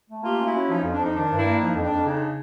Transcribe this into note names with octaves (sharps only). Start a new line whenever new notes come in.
A3
A#3 F4 G4
C#4
E4 F#4
C#4
F3 D#4 F4
F2
D4
F3 D#4
D#3 D4
G2
D4 E4
A#3
F3 D#4
F2
D4
F2
C#3 D#4